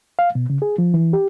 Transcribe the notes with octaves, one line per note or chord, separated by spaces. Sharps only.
F5
B2
C#3
G#4
F3
E3
G4